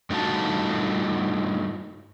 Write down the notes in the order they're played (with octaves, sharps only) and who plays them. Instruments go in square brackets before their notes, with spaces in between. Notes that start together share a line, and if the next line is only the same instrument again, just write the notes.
[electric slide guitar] G2 A3 D#4 F4 F#4 A5